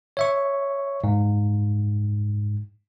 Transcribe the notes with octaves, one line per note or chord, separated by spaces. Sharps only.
C#5 E5 C#6
G#2